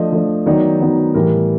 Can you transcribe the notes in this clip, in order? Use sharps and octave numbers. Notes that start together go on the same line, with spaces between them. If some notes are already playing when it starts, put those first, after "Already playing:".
Already playing: F3 A3 D4 D#5
F3 A3 D4
D#3 F#3 B3 D#4 D5
D#3 F#3 B3 D#4
A2 E3 G3 A#4